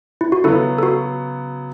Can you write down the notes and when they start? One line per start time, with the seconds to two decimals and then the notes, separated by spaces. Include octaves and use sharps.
0.21 E4
0.32 F#4
0.44 C#3 F#3 B3 E4 A4
0.78 A4
0.83 F#4